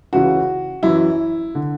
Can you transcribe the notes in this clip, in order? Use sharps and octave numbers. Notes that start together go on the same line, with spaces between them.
C#2 C#3 E3 F#4
F#2 E3 E4
D3